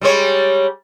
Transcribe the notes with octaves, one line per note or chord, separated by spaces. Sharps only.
G3 G#3 C#5